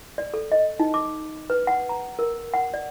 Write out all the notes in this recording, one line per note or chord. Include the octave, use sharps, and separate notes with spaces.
D5
A4
D#5
D#4
D6
B4
F#5
A#5
A#4
F#5
D5